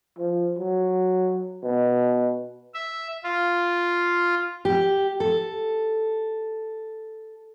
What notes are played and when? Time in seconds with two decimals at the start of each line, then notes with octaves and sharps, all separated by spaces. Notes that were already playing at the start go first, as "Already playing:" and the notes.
0.19 F3
0.59 F#3
1.63 B2
2.74 E5
3.24 F4
4.65 G4
5.20 A4